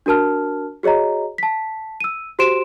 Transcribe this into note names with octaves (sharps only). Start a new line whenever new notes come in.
D4 F#4 A#4 A5 F6
F#4 G#4 C#5 D#5 A#5
A5 B6
E6 D#7
F#4 G4 C5 C6 D7 E7